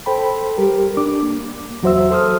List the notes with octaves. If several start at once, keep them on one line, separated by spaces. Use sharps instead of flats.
A4 C5 G5 B5
G3 G4 A#4
D4 D6
A#3
E2 F#3 F#4 C5 E5 E6
A4 C5 D#6 F6